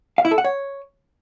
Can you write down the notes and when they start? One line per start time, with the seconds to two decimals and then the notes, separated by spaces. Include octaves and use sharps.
0.18 F5
0.25 E4
0.31 A4
0.38 F#5
0.44 C#5